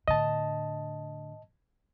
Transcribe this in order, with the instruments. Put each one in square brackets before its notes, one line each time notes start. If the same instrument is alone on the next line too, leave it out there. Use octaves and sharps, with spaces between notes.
[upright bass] A2 D3 [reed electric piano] D#5 A5